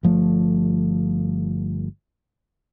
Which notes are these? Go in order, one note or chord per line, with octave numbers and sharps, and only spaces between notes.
G1 F3 A3